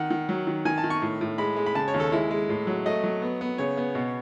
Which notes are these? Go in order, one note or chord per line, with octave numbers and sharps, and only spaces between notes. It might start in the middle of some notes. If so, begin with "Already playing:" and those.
Already playing: D#3 F#5
D#3
F#3
D#3
D#3 G#5
A5
D#3
C#6
A2
A2
G#3 B5
G#3
B5
C#3 A5
C#5
D#2
A4
G#3 E4
G#3
A2
F#3
A3 D#5
F#3
B3
B3
C#3 C#5
B3
B2